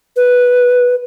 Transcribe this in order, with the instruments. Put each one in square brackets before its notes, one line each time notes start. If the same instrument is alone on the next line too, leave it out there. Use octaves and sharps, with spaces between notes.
[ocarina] B4